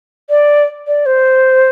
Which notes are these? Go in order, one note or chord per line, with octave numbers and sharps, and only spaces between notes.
D5
D5
C5